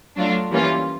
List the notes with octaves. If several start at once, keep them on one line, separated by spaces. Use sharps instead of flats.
F#3 A3 D4 F4
E3 G3 A#3 C#4 F4